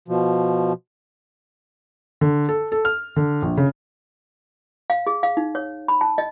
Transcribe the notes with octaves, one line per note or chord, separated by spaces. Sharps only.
B2 F3
D3
A4
A4
F6
D3
A#1
C#3
F5
G#4
F5
D#4
C#5
B5
A5
D#5